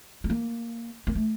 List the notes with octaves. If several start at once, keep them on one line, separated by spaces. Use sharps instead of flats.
A3
A#3
A#3
A3